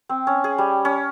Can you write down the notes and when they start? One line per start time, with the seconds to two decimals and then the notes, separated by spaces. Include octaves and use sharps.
0.09 C4
0.27 C#4
0.44 G#4
0.58 G3
0.85 C#4